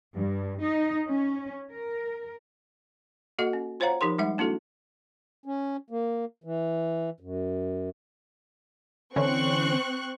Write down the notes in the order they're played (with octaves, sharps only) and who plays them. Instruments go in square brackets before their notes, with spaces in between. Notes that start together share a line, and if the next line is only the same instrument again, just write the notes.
[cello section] G2
D#4
C#4
A#4
[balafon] A#3 F#4 A4 D#5 F#5
C#4
F4 C5 C#5 F5 F#5 A#5
F3 D#4 G4 A#4 C6
G3 G#3 D#4 E5 F#5
A#3 D4 E4 F#4 A4
[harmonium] C#4
A#3
E3
F#2
[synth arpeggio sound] D3 E3 C#4 [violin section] C4 C#6 F#6